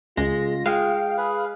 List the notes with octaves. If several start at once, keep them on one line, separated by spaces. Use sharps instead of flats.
C#2 G#3 F4 A#6
G#3 F5 G5
G#4 B4